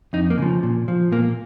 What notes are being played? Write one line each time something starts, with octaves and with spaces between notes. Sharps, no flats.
F2 D#4
A#3
C#3 F3
A#2
F3
A#2 A#3